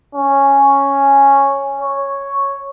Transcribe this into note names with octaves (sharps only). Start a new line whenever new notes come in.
C#4
C#5